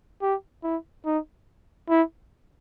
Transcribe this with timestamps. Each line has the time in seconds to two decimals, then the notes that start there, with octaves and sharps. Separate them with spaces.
0.22 G4
0.64 E4
1.06 D#4
1.89 E4